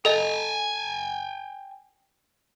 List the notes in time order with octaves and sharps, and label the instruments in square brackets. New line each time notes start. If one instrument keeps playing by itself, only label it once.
[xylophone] A4 D#5 [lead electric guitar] G5 G#5